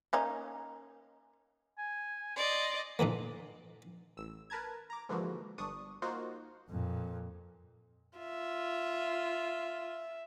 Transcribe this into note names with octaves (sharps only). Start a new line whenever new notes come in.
A#3 C#4 D#4
G#5
D5 D#5 C6
A#2 D3 E3 A#3
A1 E6
A#4 B4 A5 A#5 G#6
A#5 D6
G#2 D3 E3 F3 A#3 F#4
G1 D4 C#6 D#6
A#3 D#4 F4 F#4 C5
F2 A#2
F4 E5